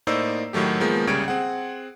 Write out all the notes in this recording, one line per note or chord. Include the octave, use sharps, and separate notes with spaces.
A2 A#3 D#4 C5 D5 E6
A2 D#3 F#3 A3 G4
D#3 F3 G#3 A#3 B3
C2 C#3 G3 C#6 G#6 D7
C4 G#4 F#5